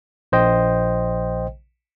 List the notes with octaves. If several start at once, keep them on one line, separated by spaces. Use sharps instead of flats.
A#1 C5 D#5 G5